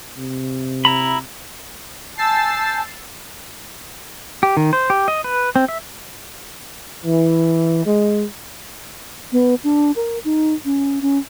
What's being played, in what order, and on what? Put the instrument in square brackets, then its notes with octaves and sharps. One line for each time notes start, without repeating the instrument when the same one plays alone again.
[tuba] C3
[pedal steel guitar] E4 A#5 B5
[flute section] G#5 A5 G6 [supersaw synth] E6 A6 C7
[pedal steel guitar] G4
D#3
C5
G4
D#5
B4
C4
E5
[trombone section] E3
G#3
[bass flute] B3
D4
A#4
D#4
C#4
C#4